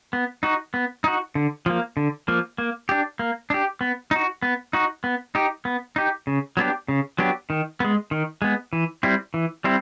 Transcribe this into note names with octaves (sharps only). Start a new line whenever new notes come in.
B3
D#4 F#4
B3
D#4 F#4
D3
F3 A#3
D3
F3 A#3
A#3
D4 G4
A#3
D4 G4
B3
D#4 F#4
B3
D#4 F#4
B3
D#4 G4
B3
D#4 G4
C#3
F#3 B3 D4 G4
C#3
F#3 B3 D4 G4
D#3
G#3 B3
D#3
G#3 B3
E3
G3 C4 E4
E3
G3 C4 E4